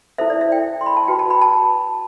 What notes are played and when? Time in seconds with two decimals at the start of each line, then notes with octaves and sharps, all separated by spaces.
0.18 E4 A4 C5 E5
0.30 D5
0.41 E5
0.52 G5
0.81 C6
0.86 B5
0.97 A5
1.08 F#4 B4 G5
1.19 A5
1.30 B5
1.42 A5